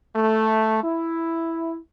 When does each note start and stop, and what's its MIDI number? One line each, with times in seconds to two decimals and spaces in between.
0.16 0.83 57
0.84 1.78 64